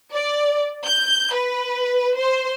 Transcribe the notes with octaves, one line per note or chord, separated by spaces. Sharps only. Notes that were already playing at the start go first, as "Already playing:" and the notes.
D5
G6
B4
C5